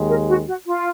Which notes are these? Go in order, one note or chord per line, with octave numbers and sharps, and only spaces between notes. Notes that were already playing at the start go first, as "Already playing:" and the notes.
Already playing: D#2 D#3 G#3
A#4
F#4
F#4
F4